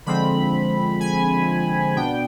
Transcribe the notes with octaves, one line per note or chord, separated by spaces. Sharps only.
D3 F3 G#3 C4 B5
G#5
B2 B3 D4 G5